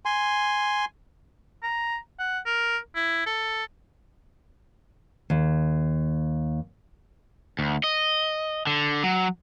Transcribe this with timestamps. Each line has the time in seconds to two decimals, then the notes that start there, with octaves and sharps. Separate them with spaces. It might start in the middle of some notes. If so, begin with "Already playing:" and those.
0.05 G#5 C6
1.63 A#5
2.19 F#5
2.46 A#4
2.95 E4
3.26 A4
5.30 D#2
7.59 D2
7.84 D#5
8.67 D3
9.04 F#3